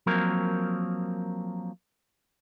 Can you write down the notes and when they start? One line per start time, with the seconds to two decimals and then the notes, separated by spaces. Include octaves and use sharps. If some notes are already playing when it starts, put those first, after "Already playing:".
0.06 F3 F#3 A#3 C4 A#4